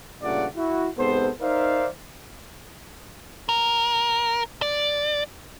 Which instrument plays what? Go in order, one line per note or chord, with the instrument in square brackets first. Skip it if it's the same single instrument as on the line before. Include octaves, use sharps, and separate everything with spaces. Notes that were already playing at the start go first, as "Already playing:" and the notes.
[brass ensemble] G2 A#2 C#3 A3 D5 F#5
E4 F#4
G#2 C3 B3 A4 C5
D#4 A#4 C5 D5 E5 F5
[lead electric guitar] A#4
D5